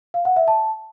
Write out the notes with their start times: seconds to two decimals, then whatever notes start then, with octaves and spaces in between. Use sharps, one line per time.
0.14 F5
0.25 F#5
0.36 E5
0.48 A5